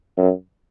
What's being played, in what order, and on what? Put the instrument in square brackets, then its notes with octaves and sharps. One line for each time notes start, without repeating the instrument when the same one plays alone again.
[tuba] F#2